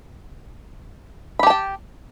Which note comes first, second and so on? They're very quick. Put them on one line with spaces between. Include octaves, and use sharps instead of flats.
B5 G4 A5 G5